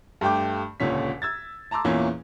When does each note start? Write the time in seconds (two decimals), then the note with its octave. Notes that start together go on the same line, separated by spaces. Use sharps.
0.21 G2 A3 G4 G5 D6
0.80 D#1 C#2 A#2 D3 C#4 B6
1.22 E6 G#6 A6
1.71 A5 A#5 C6 D6 E6
1.85 E2 A#2 E3 A#3 C#4 E4